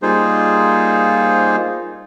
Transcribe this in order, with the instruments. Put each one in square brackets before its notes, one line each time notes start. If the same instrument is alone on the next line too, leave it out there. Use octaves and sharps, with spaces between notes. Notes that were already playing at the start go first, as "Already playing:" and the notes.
[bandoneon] G3 A#3 D#4 F4 G#4 C5